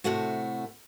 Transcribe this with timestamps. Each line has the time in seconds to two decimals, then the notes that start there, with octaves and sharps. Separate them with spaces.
0.04 A2 C3 A3 F#4